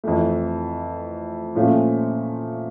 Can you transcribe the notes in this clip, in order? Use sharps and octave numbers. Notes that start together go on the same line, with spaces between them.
F2 E3 A3
A#2 F3 A3 C#4 F4